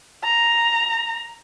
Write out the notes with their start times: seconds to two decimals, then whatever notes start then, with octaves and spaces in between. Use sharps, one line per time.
0.24 A#5